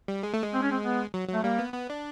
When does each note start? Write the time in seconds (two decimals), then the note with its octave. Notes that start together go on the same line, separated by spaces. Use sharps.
0.08 G3
0.23 G#3
0.34 A3
0.43 G#3
0.54 C4
0.62 C#4
0.72 C4
0.83 B3
1.14 F#3
1.29 F#3 A3
1.43 G3 A#3
1.59 B3
1.74 B3
1.90 D4